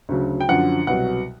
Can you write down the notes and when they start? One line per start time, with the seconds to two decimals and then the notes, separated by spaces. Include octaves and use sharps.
0.09 D2 C#3 F#3
0.40 G5
0.49 F#2 D3 F3 F#5
0.87 C2 B2 F#3 F#5